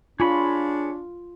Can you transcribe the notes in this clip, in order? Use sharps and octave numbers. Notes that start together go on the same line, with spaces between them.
D4 F4 G#4 C#5 B5